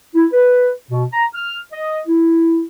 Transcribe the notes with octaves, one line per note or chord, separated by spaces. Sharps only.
E4
B4
B2
A#5
F6
D#5
E4